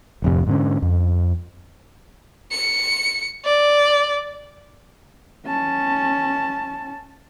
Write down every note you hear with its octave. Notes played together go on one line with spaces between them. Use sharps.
D1 F2 C3
G#2 D3 C#4
F2
C#7
D5
C#4 A5